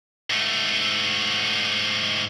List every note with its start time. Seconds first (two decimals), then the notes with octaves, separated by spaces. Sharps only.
0.30 G#2 A3